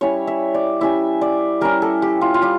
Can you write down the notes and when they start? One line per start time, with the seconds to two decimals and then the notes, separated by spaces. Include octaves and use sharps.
0.01 G3 C#4 E4 C#5
0.27 E5
0.54 D5
0.81 G3 C#4 E4 E5
1.21 D5
1.61 G3 C#4 E4 A#4
1.82 A4
2.02 G4
2.21 F4
2.34 F4
2.42 G3 G4